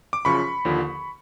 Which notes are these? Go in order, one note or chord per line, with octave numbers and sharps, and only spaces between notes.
D6
F#2 C#3 F3 B5 C#6
D#2 D3 F3